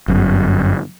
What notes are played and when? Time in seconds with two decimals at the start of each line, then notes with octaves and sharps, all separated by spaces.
0.08 G1 F#2